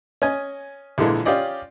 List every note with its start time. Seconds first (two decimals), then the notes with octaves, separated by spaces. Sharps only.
0.22 C#4 D#5 G#5
0.98 A#1 A#2 D3 E3 G#3
1.25 C#4 F4 G4 D5 D#5